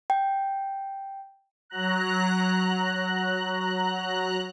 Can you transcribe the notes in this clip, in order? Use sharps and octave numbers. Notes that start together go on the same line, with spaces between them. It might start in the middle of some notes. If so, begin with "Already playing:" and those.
G5
F#3 A#5 F#6